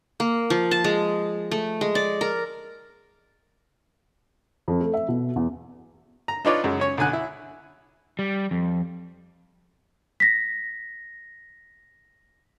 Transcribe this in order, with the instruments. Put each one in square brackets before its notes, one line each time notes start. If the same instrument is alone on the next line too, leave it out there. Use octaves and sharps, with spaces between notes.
[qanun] A#3
F3
A5
G#3
A3
G#3
D5
A#4
[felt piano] F2
A3
E5
B2
E2
[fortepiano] A#5
D4 D#4 F4 B4 C#5 D5
F#2 C#3 G#3
C#4 C#5
B1 D3 G#5 F#6
E4
[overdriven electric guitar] G3
F2
[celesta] A#6 B6